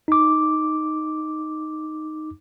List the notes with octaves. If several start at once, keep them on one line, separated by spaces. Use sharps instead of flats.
D#4 D6